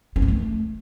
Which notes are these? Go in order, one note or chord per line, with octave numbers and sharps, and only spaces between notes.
C4
B3
A3